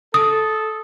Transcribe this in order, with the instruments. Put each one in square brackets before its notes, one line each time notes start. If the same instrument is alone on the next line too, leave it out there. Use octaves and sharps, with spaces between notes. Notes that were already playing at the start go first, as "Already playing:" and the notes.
[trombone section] A4 [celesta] D#6